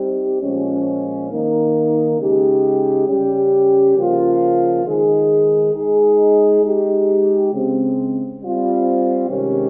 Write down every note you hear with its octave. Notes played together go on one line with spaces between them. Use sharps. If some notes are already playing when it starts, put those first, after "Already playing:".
Already playing: G3 C4 D#4 G4
A#2 F3 G#3 C#4
D#3 A#3 D#4
C#3 G#3 D#4 G4
C#3 G3 C#4 G4
C#3 F3 A#3 F4
D#3 G#3 D#4 G#4
G#3 D#4 G#4
G#3 D#4 G4
C#3 G#3 C4
G3 C4 F4
C3 D#3 G#3 C#4 G4